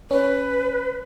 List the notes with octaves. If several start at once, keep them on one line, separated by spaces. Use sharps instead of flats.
C#4 B4